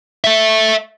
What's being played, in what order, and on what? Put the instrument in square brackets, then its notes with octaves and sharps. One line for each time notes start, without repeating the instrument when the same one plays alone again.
[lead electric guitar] A4 E5